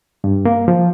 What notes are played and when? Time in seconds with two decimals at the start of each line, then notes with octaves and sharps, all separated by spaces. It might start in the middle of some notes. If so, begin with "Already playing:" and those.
0.24 G2
0.45 A#3
0.68 F3